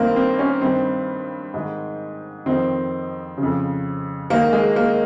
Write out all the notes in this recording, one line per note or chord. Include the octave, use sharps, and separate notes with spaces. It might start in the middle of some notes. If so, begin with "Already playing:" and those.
Already playing: G2 D#3 A#3 C4
C4
C#4
G2 D#3 C4
G#2 D#3
F2 D#3 C4
C#3
F2
G#2 D#3 A#3
G#3
A#3